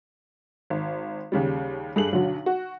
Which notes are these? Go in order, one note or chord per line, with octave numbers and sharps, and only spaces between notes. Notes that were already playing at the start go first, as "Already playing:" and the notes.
G#1
D#2 C#3 G3
G2 G#4 A4 F#7
B1 D3 F#3
F#4